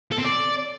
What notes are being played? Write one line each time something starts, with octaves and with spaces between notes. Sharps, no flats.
A4
C4
D5